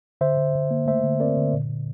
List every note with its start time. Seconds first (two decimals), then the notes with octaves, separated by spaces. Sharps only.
0.21 D3 C5 E5
0.37 D3
0.55 D3
0.71 A#3
0.87 A3 C5 E5
1.04 D3
1.20 C4 A#4 D5
1.37 D3
1.53 A#2
1.70 A#2